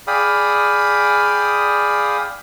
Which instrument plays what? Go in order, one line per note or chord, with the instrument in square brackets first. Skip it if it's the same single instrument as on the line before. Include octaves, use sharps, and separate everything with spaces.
[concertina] G#4 D5 F5 G5 B5 D#6